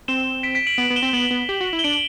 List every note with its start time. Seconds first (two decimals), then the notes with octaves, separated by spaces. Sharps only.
0.08 C4 E7 G7
0.43 B6 D7
0.55 B6 D7
0.67 D7 F#7
0.78 B3 D7 F#7
0.90 B3
0.96 E7 G7
1.03 C4
1.13 B3 D7 F#7
1.31 B3
1.49 G4
1.61 F#4
1.73 E4
1.79 G7
1.84 D4 D7 F#7